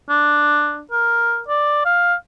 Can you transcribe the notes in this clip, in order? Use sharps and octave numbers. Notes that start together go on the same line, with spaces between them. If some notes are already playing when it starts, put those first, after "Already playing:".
D4
A#4
D5
F5